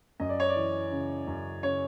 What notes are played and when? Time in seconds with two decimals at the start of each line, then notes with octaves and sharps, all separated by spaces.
0.20 F#2 D#5
0.29 D5
0.40 C#5
0.49 D5
0.56 E3
0.91 C#3
1.27 F#2
1.63 C#3 C#5